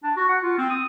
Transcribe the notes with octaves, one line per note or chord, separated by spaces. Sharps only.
D4
F#4
F#5
F4
C4
D#6